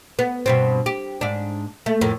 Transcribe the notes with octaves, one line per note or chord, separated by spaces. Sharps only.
B3
G2 B2 C4
G4
G#2 D4
A3
F2 A2 A#3